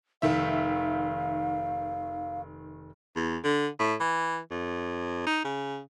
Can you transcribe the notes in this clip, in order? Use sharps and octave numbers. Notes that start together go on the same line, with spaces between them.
F1 D#3 E5 F5
E2
D3
A2
E3
F2
D#4
C#3